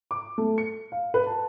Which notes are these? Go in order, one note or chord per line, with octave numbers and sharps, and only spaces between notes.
D6
A3
C#7
F5
B4
A5